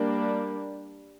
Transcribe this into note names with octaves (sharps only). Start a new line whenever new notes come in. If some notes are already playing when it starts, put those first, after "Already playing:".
Already playing: G3 A#3 D4